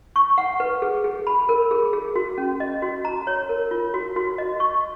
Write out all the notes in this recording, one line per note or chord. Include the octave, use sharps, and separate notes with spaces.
C#6
F#5
B4
G#4
G#4
B5
A#4
G#4
G#4
F#4
C#4
D#5
F#4
A#5
C#5
A#4
F4
F#4
F#4
D#5
C#6